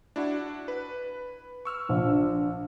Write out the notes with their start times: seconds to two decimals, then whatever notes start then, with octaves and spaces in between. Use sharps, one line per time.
0.16 D4 E4 F#4
0.68 B4
1.65 C#6 E6 F6
1.89 A#1 D4